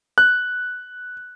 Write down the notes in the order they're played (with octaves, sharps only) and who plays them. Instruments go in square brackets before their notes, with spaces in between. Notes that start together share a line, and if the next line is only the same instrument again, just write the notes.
[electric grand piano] F#6